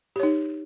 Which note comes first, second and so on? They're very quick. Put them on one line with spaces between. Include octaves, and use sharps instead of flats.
G4 C#5 D#4